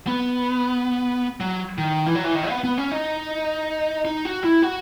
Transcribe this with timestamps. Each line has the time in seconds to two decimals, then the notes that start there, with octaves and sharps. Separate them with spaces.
0.07 B3
1.40 F#3
1.78 D#3
2.06 E3
2.15 F#3
2.24 E3
2.35 D#3
2.49 B3
2.64 B3
2.78 C#4
2.92 D#4
4.05 D#4
4.25 F#4
4.44 E4
4.62 F#4